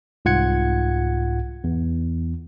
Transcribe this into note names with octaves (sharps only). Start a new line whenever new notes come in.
C2 G#2 F4 F#5 G#6 C#7
E2